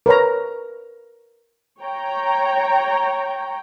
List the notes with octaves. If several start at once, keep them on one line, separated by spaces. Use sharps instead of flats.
A#4 B4 C#5 A#5
C#5 G5 A#5